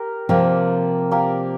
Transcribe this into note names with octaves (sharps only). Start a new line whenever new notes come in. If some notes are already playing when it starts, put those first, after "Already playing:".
Already playing: G4 A#4
C3 F3 A#3 G4 A#4 D5
A#3 G4 A#4 D5